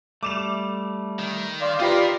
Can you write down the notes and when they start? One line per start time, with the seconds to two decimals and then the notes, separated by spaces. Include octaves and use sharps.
0.23 G3 A3 D6 E7 F7
1.19 D#3
1.61 D5 F5 C6
1.80 F4 G4 A#4 B4 D#5